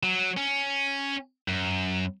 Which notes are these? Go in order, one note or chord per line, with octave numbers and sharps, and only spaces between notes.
F#3
C#4
F#2